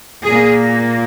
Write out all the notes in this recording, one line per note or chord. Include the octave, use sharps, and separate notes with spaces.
A#2 A#3 G#4